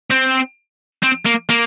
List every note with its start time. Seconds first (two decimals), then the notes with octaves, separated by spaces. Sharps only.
0.10 C4
1.03 C4
1.26 A#3
1.50 A#3